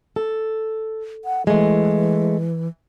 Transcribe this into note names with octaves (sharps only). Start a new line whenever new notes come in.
A4
F#5
E3 G#3 A3